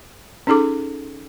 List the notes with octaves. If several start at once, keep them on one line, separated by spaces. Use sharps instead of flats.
C#4 D#4 G#4 A4 D6